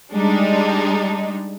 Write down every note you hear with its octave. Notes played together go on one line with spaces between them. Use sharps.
G3 G#3 D4 D#4